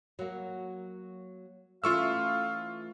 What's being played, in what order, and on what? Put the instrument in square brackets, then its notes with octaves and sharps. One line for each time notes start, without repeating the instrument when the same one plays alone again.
[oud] F#3 A#3
[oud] E3 A3 C#4 [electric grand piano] F4 C#6 E6 [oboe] F5